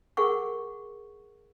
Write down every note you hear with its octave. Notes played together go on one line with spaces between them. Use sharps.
G#4 A#4 F#5 C#6